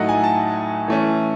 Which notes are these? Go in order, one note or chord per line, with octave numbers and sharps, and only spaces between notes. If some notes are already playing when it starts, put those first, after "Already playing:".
Already playing: A2 F#3 A3 D#4 D#5 F#5
G#5
A5
E3 A3 C#4